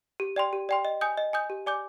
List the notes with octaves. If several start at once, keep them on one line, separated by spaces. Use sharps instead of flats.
G4
D5 G5 C6
G4
D5 G5 C6
D#5
G#5 D#6 G6
D#5
G#5 D#6 G6
G4
D5 G#5 D6 G6